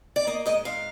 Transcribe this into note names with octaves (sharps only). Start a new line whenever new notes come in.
D5
A#3 D#5
G#2 D#5
G#2 F5